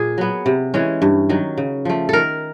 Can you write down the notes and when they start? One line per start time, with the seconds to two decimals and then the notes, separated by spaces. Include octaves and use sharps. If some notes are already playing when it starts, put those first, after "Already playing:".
Already playing: A#2 G#4
0.18 F#3 B3
0.46 C3
0.74 E3 G#3 C#4
1.02 G2
1.29 D#3 F#3
1.57 C#3
1.85 F3 A3
2.09 D#3 A4 A#4